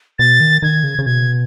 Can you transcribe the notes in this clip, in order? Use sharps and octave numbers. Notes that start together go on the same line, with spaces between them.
B2 A6
D#3
D#3 G#6
C#3
C#3
B2 G#6